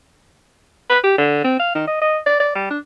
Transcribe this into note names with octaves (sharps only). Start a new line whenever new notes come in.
B4
G4
D3
C4
F5
D#3
D#5
D#5
D5
D5
G3
D4